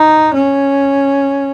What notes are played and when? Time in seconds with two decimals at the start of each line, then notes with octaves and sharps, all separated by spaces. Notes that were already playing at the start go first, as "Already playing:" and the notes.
Already playing: D#4
0.35 C#4